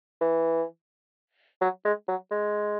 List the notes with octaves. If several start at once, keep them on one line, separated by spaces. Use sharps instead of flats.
E3
F#3
G#3
F#3
G#3